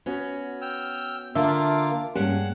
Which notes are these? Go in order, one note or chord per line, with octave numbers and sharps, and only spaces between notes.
B3 C#4 F#4
G5 E6 F6
D3 A#3 D4 F4 E5 A5 D6
G2 G3 G#3 A#3 C#4 F#5 A5